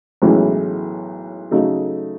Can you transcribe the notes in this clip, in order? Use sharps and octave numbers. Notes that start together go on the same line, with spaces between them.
B1 A2 E3 G#3 C#4
C#3 F#3 A3 D#4 A4